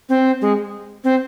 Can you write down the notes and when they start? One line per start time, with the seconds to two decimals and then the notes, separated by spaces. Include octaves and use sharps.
0.09 C4
0.41 G#3
1.04 C4